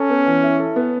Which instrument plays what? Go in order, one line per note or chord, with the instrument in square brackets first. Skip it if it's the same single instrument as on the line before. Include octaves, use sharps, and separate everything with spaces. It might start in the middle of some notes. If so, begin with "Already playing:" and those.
Already playing: [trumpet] C#4 [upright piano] A4
[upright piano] B3
E3
E4
A4
B3